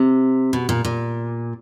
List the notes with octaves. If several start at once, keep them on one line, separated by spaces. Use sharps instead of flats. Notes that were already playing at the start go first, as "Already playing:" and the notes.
Already playing: C3
B2
A#2
A#2